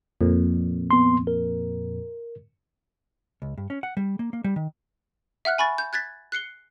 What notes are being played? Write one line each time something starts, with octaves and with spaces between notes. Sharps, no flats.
F2 A#2
B3 C6
A#4
C#2
G2
C#4
F#5
G3
A#3
A#3
G3
D#3
E5 F#5 F6 F#6
G#5 B5 C#6 A6
G6
F#6 G#6 A6 B6
F#6 C7 C#7 G7